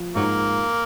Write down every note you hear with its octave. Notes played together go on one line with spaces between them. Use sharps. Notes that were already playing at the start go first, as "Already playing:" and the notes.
Already playing: F3
G#2 F#3 A#3